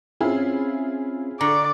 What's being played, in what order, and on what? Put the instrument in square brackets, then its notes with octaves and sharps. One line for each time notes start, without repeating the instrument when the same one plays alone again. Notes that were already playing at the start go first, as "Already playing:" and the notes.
[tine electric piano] C4 C#4 [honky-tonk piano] E4 F4 G#4
[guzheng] D3 [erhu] D5 [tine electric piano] A#5 C#6